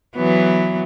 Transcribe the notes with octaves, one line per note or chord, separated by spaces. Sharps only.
E3 F#3 B3